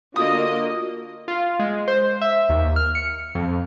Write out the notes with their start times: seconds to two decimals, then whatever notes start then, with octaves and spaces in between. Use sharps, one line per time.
0.16 D3 A#3 F4 F#4 D#5 D#6
1.28 F4
1.59 G#3
1.88 C5
2.21 E5
2.49 D#2
2.76 F6
2.95 C#7
3.35 F2